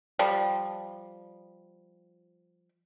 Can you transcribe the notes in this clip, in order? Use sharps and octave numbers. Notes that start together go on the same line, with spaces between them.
F3 G3